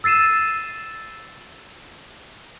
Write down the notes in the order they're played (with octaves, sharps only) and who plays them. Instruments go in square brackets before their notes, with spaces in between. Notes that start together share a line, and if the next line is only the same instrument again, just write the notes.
[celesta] E6 A6 C7 D#7 E7